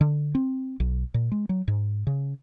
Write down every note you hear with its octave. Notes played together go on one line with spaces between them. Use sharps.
D3
C4
B1
A#2
G#3
F#3
G#2
C#3